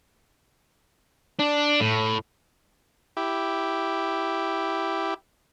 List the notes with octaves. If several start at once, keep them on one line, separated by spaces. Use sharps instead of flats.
D4
A2
E4 G4